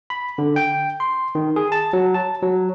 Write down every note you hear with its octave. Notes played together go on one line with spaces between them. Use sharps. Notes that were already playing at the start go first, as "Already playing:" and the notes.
B5
D3
G5
C6
D#3
G#4
A5
F#3
A5
F#3